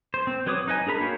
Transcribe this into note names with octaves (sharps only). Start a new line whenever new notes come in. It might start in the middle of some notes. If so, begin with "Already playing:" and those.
C5
C4
F#3 B4 C#5 D6 D#6
D#4 B4 D#5 G#5
D4 G#4 A#4 B5
A#3 F#4 C#5 F5 G5